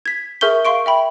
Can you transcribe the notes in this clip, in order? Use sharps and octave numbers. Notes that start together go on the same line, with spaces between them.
G#6 B6
G#4 A#4 E5 C#6 G6 G7
F5 C6 C#6 D7
E5 G5 B5